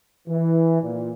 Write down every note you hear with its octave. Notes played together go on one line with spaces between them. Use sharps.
E3
A#2